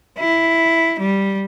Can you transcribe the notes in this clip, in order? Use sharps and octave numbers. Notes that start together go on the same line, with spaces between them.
E4
G3